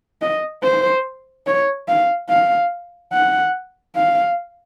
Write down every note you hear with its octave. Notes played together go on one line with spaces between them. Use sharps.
D#5
C5
C#5
F5
F5
F#5
F5